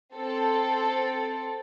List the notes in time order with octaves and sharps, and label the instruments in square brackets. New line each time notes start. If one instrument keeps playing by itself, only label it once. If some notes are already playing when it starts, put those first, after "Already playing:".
[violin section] C4 A4